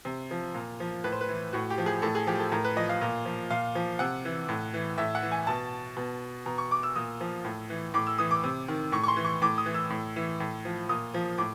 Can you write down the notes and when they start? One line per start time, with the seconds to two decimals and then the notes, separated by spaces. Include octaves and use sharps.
0.05 C3
0.31 F3
0.54 A#2
0.80 F3
1.04 A2 B4
1.12 C5
1.21 B4
1.28 E3
1.53 A2 F#4
1.70 G4
1.78 F3
1.86 G#4
2.02 A2 A4
2.15 G#4
2.27 F3 G4
2.40 A4
2.52 A2 A#4
2.64 B4
2.76 F3 D#5
2.89 F5
3.01 A#2
3.25 F3
3.50 A#2 F5
3.75 F3
3.99 C3 F#5
4.25 E3
4.49 A2
4.74 E3
4.98 A2 E5
5.15 F#5
5.22 E3
5.32 G#5
5.47 B2 A5
5.97 B2
6.46 B2 A#5
6.58 C#6
6.71 D6
6.83 E6
6.95 A#2 D#6
7.20 F3
7.45 A2
7.70 E3
7.94 A2 D6
8.07 E6
8.18 E3 D#6
8.31 D6
8.44 C3
8.68 D#3
8.92 A2 C#6
9.03 C#6
9.08 C6
9.16 E3
9.25 C#6
9.42 A2 D6
9.58 D#6
9.66 E3
9.74 E6
9.90 A2
10.16 E3
10.40 A2
10.65 F3
10.89 A#2 D#6
11.14 F3
11.38 A2 D6